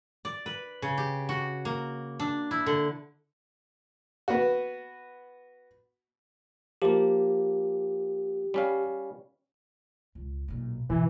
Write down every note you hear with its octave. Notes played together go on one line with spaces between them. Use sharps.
D5
B4
C#3
G4
F#4
A#3
D4
E4
D3
B3 F#4
F3 A#3 G4
G3 C#4 F5
C#2
B1 A#2
G2 B2 E3